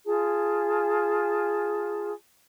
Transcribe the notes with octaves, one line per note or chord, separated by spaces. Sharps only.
F4 G#4 A5